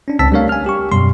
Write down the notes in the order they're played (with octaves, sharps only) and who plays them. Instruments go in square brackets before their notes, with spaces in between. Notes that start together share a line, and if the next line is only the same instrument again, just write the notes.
[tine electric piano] C#4 D4
C#2 C4 A5 E6 B6
G3 A3 D4 A#4 C#5 F5
G#5 F6
G4 C#6
F#2 B2 G3 C6